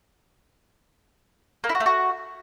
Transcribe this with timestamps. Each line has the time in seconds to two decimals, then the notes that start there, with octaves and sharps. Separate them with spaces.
1.64 A#3
1.69 E4
1.75 F#4
1.80 A3
1.86 F#4